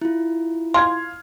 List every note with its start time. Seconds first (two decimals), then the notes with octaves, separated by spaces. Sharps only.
0.02 E4 F4
0.74 F5 C6 F6 G#6